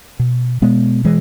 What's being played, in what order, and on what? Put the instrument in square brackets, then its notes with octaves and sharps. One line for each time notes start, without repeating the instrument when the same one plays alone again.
[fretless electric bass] B2
B2 G#3 B3
E3 G#3